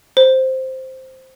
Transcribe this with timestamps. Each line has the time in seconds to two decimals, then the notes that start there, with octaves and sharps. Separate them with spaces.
0.17 C5